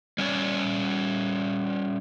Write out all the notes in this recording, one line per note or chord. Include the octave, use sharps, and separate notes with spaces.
G3 C#4 C#5 D5